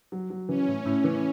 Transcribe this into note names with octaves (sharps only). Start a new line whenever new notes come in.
F#3
F#3
E3 C#4
A2
A2
E3